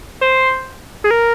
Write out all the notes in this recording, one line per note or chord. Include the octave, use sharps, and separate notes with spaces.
C5
G#4
A#4